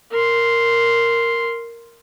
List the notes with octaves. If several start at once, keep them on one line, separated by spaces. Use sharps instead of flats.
A#4 C6